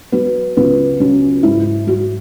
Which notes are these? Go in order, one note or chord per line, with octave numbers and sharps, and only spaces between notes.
F#3 B3
C#2 B3
F#3 C#4
G#2 E4
F#3 F#4